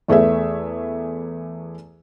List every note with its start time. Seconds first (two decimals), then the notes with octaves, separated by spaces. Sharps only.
0.08 E2 A3 G#4 B4 E5